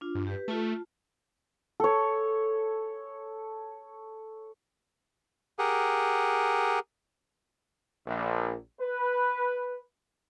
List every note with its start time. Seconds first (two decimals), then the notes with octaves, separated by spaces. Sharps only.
0.01 D4 F4
0.15 G2
0.27 G4 B4
0.48 A3 F4 A5
1.80 A4 C#5
5.59 G4 G#4 A#4 F#5
8.06 A#1
8.79 B4